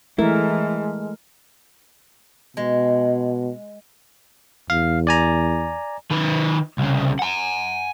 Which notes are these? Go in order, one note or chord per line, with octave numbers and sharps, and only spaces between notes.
E3 G#3 A3 E4 A#4
B2 G#3
E2 F5
D5 G#5 A#5
D#3 B4
C2 C#3
F#5 G#5